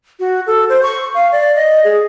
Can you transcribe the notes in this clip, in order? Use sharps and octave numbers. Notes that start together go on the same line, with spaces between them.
F#4
A4
C5
C#6
F5
D5
D#5
G#4